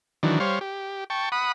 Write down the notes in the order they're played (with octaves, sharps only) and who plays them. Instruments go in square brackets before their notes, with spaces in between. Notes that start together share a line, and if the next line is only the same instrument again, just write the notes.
[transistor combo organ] D#3 E3 F#3 D4
G3 C5 C#5 F5
G4
G5 A5 C#6
F#5 B5 D#6